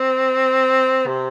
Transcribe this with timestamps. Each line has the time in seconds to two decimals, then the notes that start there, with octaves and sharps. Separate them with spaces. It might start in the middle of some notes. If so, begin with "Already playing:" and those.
Already playing: C4
1.07 C3